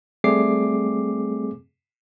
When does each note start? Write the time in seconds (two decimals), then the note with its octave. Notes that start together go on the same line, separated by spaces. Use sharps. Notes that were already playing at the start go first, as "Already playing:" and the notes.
0.24 G3 A3 C4 G#4 D6 C7